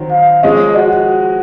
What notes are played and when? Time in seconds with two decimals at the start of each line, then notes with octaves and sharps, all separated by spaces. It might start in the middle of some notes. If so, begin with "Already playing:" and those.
Already playing: D#3 F#3 C4
0.11 F5
0.43 F3 G#3 C#4 D#5
0.76 F#4